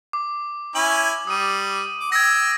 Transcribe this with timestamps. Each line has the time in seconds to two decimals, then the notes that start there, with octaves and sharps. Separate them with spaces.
0.13 D6
0.75 C#4 E4 G#5 F#7
1.27 G3 D#6 D#7
2.00 D6
2.12 G5 E6 G#6 A#6